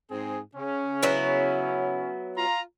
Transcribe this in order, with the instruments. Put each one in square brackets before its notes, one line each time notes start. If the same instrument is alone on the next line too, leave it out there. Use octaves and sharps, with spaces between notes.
[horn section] G#2 C4 G#4
C#3 C#4
[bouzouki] F#3 B3 E4
[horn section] F4 A#5